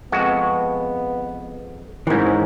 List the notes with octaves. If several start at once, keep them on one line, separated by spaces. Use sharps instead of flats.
F2 G#3 B3 F#4
G#2 E3 G#3 C4 C#4 A#4